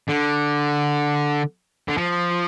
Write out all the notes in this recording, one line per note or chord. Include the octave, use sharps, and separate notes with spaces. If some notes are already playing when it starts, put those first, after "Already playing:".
D3
D3
F3